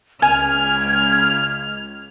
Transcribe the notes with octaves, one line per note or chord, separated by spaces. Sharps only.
C#2 G#5 F6 G#6